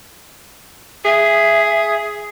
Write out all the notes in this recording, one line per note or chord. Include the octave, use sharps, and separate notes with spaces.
G#4 E5